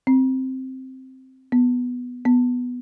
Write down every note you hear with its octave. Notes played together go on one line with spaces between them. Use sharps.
C4
B3
B3